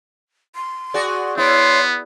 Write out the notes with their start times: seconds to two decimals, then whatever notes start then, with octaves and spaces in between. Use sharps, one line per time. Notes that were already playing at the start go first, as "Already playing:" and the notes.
0.56 C6
0.94 F#4 G#4 D5
1.37 B3 E4 C#5 C6